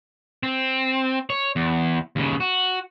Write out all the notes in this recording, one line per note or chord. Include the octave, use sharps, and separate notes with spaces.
C4
C#5
E2
D#2 C#3
F#4